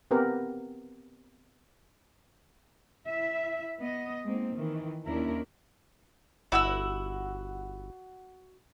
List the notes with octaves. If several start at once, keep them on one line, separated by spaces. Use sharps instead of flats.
B3 C4 G4 A#4 B4
E4 E5
B3 D#5
G#3 A#3 C4 D#4
D#3 E3
D#2 C#4 D4 E4 A#4
G1 E4 F#4 F#5 E6